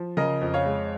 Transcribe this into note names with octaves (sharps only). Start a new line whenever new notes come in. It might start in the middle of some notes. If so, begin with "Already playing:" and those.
Already playing: F3
C#3 A#4 D#5
F2
C#5 F5
G#3